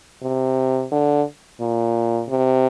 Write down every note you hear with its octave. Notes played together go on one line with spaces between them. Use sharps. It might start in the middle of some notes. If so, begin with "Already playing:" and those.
C3
D3
A#2
C3